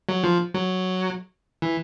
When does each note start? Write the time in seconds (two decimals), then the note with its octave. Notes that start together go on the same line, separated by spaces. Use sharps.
0.09 F#3
0.24 F3
0.54 F#3
1.62 E3